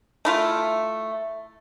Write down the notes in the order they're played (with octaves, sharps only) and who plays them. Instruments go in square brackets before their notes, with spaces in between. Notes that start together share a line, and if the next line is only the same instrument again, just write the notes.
[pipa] A3 E4 F4